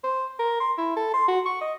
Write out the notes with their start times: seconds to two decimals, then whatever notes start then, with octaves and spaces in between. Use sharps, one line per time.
0.04 C5
0.39 A#4
0.61 C6
0.78 E4
0.96 A4
1.14 C6
1.28 F#4
1.46 C#6
1.61 D#5